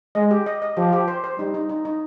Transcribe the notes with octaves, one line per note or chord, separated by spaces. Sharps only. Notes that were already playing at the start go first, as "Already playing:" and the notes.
G#3 D#5
G4
D#5
D#5
F3 G4
G4
C5
C5
G3 D#4
D#4
D#4
D#4